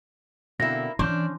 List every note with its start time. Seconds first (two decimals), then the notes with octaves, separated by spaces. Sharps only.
0.60 B2 D3 A#3 C4 E4 A#6
0.99 E3 C#4 D4 C5